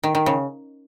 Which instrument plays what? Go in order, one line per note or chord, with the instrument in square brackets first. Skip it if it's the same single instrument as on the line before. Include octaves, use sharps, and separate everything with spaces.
[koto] D#3
D#3
C#3